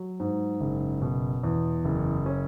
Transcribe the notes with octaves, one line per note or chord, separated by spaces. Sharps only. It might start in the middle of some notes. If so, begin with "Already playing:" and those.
Already playing: F#3
G#2
F#1
B2
E2
F#1
C#4